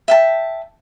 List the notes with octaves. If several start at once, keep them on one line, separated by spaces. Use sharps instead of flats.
E5 G5 A5